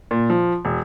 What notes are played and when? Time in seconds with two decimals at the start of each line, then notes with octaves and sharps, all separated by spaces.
0.11 A#2
0.30 F3
0.65 E1